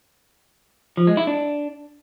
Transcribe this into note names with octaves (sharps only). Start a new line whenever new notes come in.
F3
G#3
E4
D4